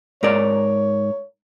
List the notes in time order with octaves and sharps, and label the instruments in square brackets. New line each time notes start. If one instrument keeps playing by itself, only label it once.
[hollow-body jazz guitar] G#2 A#4 D5 [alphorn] C#5